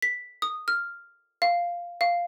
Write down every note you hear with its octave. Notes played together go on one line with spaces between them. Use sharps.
B6
D#6
F6
F5
F5